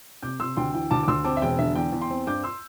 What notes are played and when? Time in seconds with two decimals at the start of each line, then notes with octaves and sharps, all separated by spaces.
0.23 C3 D6 G6
0.40 C3 C6 E6
0.57 D2 G5 C6
0.74 E3 G5
0.91 D2 A5 D6
1.03 D6
1.08 D2 C6 E6
1.24 C4 A5 D6
1.37 E5
1.42 E1 G5
1.59 D3 E5
1.75 E2 G5
1.92 E2
2.01 G5 C6
2.11 C4
2.27 G2 D6 G6
2.44 C6 E6